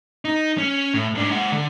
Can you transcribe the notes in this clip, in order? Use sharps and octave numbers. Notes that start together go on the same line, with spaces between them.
D#4
C#4
A2
G#2 D4
G#3 F#5
D3